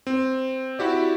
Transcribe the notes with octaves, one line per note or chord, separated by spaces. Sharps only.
C4
E4 F#4 G4 D5